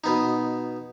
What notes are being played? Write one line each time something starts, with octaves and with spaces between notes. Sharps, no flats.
B2 B3 D#4